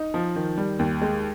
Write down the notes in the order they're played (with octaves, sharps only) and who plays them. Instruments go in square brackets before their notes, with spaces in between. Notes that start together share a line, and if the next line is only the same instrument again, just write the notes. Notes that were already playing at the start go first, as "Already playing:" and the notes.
Already playing: [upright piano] D#4
F3
D#3
G3
D#2
G#3